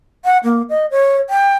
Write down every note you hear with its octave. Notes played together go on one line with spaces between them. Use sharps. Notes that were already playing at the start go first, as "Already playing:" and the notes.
F#5
A#3
D#5
C#5
G5